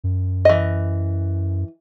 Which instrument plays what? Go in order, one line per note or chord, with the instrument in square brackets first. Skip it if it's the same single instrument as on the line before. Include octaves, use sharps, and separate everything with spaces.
[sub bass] F#2
[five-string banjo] E3 D#5